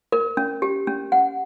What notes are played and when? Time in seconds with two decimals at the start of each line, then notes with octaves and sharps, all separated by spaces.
0.12 A#4
0.37 C#4
0.62 G4
0.87 C#4
1.12 F#5